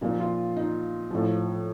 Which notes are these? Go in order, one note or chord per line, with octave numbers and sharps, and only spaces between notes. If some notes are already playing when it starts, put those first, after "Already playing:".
A#2 F3 D#4
F4
D#4
A2 F3